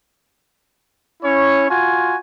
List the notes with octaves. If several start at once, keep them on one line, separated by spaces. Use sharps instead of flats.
C#4 E4 C#5
F4 F#4 G#5